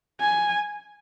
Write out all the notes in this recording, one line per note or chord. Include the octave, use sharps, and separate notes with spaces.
G#5